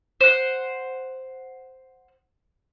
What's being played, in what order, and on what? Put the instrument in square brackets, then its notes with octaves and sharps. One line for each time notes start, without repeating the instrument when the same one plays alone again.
[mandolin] C5 F#5